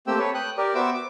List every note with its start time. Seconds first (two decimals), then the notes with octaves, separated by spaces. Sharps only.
0.07 A3 A#3 C4 G4 G5 E6
0.19 A4 B4 C#5
0.34 G5 D#6 F#6
0.58 G4 A#4 D5
0.75 B3 F#4 C5 E5 D6 E6
0.94 D6